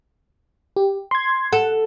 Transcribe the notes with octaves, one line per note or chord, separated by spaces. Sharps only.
G4
C6 G#6
A4 F#5